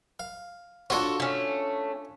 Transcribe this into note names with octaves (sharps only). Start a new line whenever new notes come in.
F5
D4 F4 F#4 A4 C#5
A3 C#4